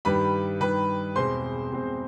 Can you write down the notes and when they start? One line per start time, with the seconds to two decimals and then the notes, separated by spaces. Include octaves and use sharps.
0.05 G2 D#3 G3 B4 B5
0.61 G2 D#3 G3 B4 B5
1.16 E2 B2 G#3 C4 C5 C6
1.72 E2 B2 G#3 C4